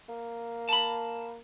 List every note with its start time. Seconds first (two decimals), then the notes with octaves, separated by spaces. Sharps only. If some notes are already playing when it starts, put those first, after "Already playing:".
0.09 A#3
0.69 A5 B5